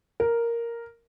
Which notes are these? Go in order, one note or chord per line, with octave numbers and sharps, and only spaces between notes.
A#4